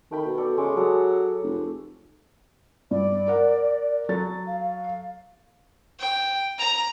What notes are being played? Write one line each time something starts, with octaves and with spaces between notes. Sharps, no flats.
D#3 A3 G5 B5
B2
A4 D5
C#3 G#3 C#6 D6
F#3 G#4 A4
F1
G2 D5
A#4 F#5
F#3 A4 A6
F5
F5
G5
A#5